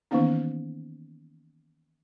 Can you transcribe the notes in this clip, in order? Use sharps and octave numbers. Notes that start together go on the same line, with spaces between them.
D#3 E3 A#3 B3 C#4 D#4